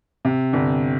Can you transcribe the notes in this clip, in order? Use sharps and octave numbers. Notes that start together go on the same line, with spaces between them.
C3
G1